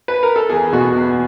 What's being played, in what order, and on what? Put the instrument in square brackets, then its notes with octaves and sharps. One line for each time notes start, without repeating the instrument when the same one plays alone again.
[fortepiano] B4
A#4
A4
E2 G#4
B2 F#4
E2